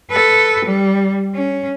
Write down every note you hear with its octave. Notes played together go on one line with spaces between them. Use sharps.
A4 B4
G3
C#4